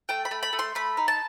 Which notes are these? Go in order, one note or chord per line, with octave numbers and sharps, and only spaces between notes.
A3 G5
B5
A3
B5
A3
C6
A3 B5
D#4
A5